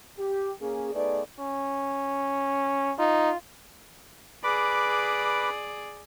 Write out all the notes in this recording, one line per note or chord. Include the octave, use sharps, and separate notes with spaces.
G4
A#3 C#4 G#4
A3 B3 D#4 G#4 B4 D5
C#4
D#4 F4
G#4 B4 D5 B5 D6